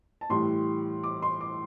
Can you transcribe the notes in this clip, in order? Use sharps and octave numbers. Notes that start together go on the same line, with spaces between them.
A5
A2 E3 G3 C6
D6
C6
D6